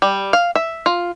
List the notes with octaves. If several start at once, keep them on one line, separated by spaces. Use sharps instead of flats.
G3
F5
E5
F4